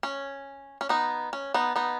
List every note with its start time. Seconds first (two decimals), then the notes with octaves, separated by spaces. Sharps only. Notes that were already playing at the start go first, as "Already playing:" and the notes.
0.03 C#4
0.81 C#4
0.89 B3 D#4
1.33 C#4
1.54 B3 D#4
1.76 B3 D#4